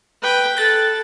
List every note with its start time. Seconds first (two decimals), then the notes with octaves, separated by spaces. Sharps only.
0.22 B4 G5
0.57 A4 F#6 A6